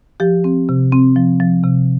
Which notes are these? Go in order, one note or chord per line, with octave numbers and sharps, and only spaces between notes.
F3 G4
C4
C3
C4
F3
F3
C3